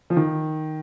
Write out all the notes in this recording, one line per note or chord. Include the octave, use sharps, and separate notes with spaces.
F3
D#3